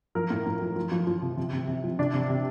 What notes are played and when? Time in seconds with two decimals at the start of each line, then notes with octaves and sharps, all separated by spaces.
0.15 F3 A#4
0.30 A2
0.46 A2
0.61 F3
0.76 F3
0.92 F3
1.07 F3
1.22 C3
1.37 C3
1.53 C3
1.68 C3
1.84 F3
1.99 C3 D4
2.14 C3
2.30 C3